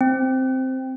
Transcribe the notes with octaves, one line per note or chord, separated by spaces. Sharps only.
C4